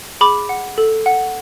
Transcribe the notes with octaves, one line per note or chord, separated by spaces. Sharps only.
G#4 B5 D6
F#5
A4
F#5